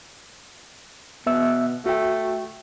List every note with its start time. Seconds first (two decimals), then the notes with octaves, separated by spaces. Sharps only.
1.26 B2 B3 E5 E6
1.86 A3 F#4 G5